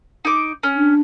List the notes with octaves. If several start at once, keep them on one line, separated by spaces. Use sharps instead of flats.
D#4 D6
C#4
D4